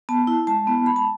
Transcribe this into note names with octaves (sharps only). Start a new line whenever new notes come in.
B3 A5
E4
G#3 A5
B3 E4
G#3 B5
A5